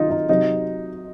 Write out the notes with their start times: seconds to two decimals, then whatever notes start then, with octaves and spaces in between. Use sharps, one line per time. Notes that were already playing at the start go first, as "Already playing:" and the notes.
Already playing: C3 D#3 F#3 D#4 F4
0.10 D#4
0.29 C3 F#3 D#4